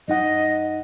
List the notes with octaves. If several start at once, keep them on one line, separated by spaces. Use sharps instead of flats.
F#2 D#4 D#5 F#5